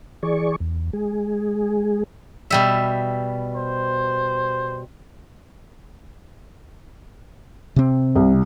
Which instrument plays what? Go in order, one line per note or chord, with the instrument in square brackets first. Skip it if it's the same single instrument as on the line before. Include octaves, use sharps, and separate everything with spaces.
[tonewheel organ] E3 G#4 D5 C#6
E2
G#3 G#4
[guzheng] B2 G3 E5
[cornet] C5
[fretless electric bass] C3 C4
[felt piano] C2